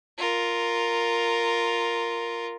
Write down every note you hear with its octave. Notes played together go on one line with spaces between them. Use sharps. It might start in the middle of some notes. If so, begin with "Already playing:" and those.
F4 A#4